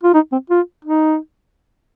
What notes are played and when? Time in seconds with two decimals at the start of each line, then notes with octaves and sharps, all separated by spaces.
0.03 F4
0.14 D#4
0.32 C4
0.50 F4
0.85 D#4